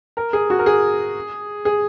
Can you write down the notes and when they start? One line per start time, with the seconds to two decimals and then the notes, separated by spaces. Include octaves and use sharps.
0.17 A#4
0.33 G#4
0.50 F#4
0.59 A#4
0.66 G#4
1.65 G#4